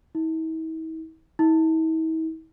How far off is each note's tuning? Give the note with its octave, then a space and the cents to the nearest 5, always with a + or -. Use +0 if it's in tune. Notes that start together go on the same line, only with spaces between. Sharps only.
E4 -45
E4 -45